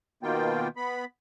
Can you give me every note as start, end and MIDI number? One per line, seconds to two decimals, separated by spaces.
0.23 0.68 47
0.23 0.68 51
0.23 0.68 58
0.23 0.68 59
0.23 0.68 65
0.23 0.68 79
0.77 1.05 59
0.77 1.05 83